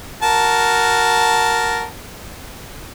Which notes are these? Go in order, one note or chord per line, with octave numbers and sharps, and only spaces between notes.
F#4 A#4 A5